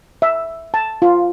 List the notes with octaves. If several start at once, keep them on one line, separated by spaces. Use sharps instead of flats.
E5
A5
F4